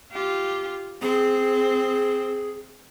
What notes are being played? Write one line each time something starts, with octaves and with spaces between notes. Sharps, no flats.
F4 G4
C4 G#4